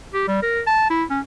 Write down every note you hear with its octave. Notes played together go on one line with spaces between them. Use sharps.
G4
G3
A#4
A5
E4
C#4